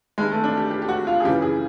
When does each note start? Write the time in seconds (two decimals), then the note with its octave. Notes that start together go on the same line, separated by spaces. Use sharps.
0.18 G2 D#3 G3 G#3
0.31 A3
0.44 D4
0.57 G4
0.71 G4
0.82 G4
0.89 F#4
1.07 F4
1.20 G#4
1.24 F#2 C#3 E3 G3 G4
1.42 G#4